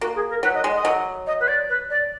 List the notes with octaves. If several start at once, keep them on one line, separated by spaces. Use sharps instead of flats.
A#3 F#4
G#4
A#4
F#3 B4
D#5
G#3
D#5
F#3
D#5
B4
D5
B4
D5